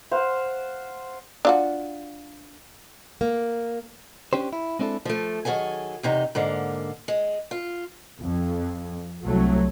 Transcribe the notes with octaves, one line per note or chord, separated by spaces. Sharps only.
C5 F5 F#5
D4 F4 F#4
A#3
C#4 D4 G4 C5
E4
G#3 C4 D4 E4 A4
F3 A3
D#3 F#3 G#4 A4 G#5
E2 C3 D#4
G#2 D3 A#3
G#3
F4
F2
C2 F#3 A3